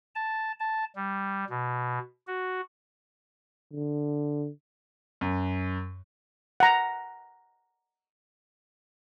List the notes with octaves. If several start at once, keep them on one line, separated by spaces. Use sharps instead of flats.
A5
A5
G3
B2
F#4
D3
F#2
F#5 A#5